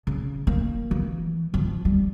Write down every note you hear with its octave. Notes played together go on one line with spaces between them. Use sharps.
C#3
A#3
E3
F3
G3